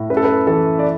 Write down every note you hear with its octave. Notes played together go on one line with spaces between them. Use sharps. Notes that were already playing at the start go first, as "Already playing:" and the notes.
Already playing: A2
F#2 B4
A4
B4
E3 A4
D5